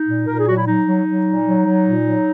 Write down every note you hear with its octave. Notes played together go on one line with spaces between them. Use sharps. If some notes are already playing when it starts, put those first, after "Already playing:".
Already playing: D#4
A#2
A#2 A#4
G#4
F#3 F#4
E4
F#3 D#4
F#3
F#3
A#2
F#3
F#3
A#2
F#3